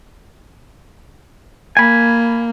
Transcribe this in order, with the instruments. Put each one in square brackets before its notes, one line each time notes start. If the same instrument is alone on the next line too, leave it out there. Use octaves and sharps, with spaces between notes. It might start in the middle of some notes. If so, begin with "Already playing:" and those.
[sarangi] A#3 [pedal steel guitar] G#5 B5